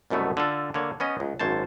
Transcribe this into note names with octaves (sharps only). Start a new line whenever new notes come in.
C2 F#2 B2 A3 B3
D3 F4 A4
D3 A#3 C#5
B3 C#4 D#5
C#2
G#1 F#2 C5 C#5 A5